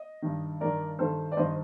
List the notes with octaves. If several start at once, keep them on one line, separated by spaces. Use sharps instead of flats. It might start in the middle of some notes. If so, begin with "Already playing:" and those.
Already playing: D#5
G2 D#3
G2 D#3 A#4 D5
G2 D#3 A4 C5
D5
G2 D#3 C5 D#5